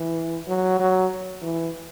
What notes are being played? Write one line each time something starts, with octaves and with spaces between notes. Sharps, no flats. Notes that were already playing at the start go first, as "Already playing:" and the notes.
Already playing: E3
F#3
F#3
E3